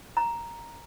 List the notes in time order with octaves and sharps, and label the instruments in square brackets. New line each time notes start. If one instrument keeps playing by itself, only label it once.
[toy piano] A#5